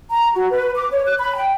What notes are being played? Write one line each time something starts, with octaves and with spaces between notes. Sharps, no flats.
A#5
F#4
B4
D6
C#5
F#6
B5
G5